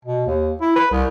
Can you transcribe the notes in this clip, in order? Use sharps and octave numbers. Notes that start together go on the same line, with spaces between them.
B2
D#2
E4
B4
C2